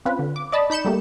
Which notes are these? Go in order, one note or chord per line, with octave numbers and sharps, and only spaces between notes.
C4 C#4 F4 B4
D3
D6
D5 D#5 A5 B5
D#4 B5 G6 C#7 E7
G3 A3 A#3 G4